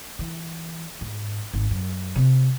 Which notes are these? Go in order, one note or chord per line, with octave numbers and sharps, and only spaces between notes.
E3
G#2
G#1
F#2
C3 C4